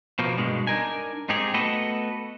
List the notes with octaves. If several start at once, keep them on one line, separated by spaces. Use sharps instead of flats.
B2 F3 A#3
G2 B2 G#3
D4 D#4 A#4 G#5
G#2 C4 D#4 G4 G#4
A3 B3 F#4 A4 B4 D#5